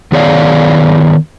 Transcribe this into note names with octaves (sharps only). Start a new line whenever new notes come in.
D#3 B3 G#4 C#5 D5 F5